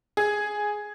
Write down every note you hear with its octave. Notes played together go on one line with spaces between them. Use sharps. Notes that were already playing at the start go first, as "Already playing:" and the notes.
G#4